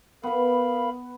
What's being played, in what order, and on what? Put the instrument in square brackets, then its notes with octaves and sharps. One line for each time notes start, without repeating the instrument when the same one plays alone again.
[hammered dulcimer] B3 B4 [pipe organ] A#4 F5 B5